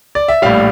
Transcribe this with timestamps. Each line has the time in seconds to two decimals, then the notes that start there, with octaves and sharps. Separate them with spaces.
0.15 D5
0.28 E5
0.42 A#1 A2 G3 F5